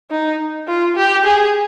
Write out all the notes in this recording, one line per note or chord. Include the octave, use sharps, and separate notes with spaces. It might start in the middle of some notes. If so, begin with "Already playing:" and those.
D#4
F4
G4
G#4